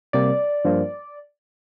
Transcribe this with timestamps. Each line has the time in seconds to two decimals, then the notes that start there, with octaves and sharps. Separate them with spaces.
0.13 C3 G3 A#3 D5
0.65 G2 F3 A#3